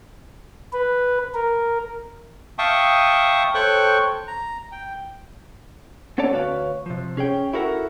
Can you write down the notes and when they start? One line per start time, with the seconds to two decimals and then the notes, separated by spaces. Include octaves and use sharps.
0.73 B4
1.34 A#4
2.59 E5 F5 G5 A5 C#6 D#6
3.55 A4 C5 C#5 G5 C#6 F#6
4.28 A#5
4.72 G5
6.18 B3 C#4 A4 C#5 D5 A5
6.32 D2 F#4 B4 C#5 F5
6.86 C3 F3
7.17 C#4 G#4 C#5 G5
7.53 E4 F#4 A4 A#4 E5 F#5